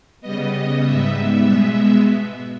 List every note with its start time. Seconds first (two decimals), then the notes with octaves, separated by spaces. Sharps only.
0.21 C#3 G3 B3 D#5
0.83 G#2 G3 B3 E5
1.45 B2 G#3 B3